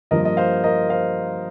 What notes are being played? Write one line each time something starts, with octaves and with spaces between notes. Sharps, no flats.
G2 F3 A#3 A#4 D#5
D#5
C5 F5
A#4 D#5
C5 F5